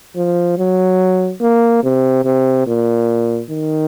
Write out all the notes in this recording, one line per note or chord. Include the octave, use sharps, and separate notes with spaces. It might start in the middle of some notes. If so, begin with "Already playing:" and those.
F3
F#3
A#3
C3
C3
A#2
D#3